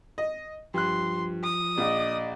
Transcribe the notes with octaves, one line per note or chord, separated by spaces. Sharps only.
D#5
G2 F3 C6 F#6
D#6
A#1 D5 D#5